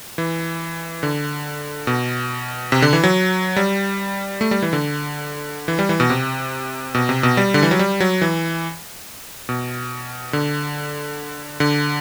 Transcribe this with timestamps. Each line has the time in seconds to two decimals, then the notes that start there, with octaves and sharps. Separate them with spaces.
0.18 E3
1.03 D3
1.87 B2
2.72 C3
2.82 D3
2.93 E3
3.03 F#3
3.56 G3
4.41 A3
4.51 G3
4.62 E3
4.73 D3
5.68 E3
5.79 G3
5.89 E3
6.00 B2
6.10 C3
6.95 B2
7.09 C3
7.23 B2
7.37 G3
7.54 D3
7.62 E3
7.71 F#3
7.79 G3
8.00 F#3
8.22 E3
9.49 B2
10.33 D3
11.60 D3